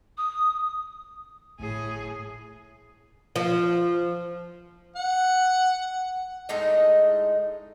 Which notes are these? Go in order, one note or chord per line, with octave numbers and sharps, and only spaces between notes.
D#6
G1 A2 G#4
F3
F#5
A2 G#3 D#4 D#5